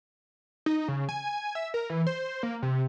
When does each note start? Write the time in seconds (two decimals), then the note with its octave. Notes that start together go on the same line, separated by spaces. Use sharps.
0.66 D#4
0.88 C#3
1.09 G#5
1.55 E5
1.74 A#4
1.90 E3
2.07 C5
2.43 A#3
2.62 C3